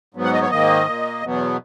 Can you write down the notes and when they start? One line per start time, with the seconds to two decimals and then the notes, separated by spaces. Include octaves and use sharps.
0.14 G#2 F#3 B3
0.24 F#5
0.33 D#5
0.42 C#5
0.50 G#2 D#3 A#3 D#5
0.87 A#2 A#3
1.21 E2 B2 F#3 B3